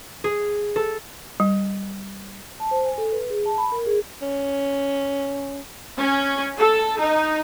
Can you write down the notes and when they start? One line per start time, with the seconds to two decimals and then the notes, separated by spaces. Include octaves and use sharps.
0.24 G#4
0.76 A4
1.40 G3
2.60 A5
2.71 C5
2.85 G#5
2.98 A4
3.12 B4
3.30 G#4
3.46 A5
3.58 B5
3.72 A#4
3.86 G#4
4.22 C#4
5.99 C#4
6.57 A4
6.99 D#4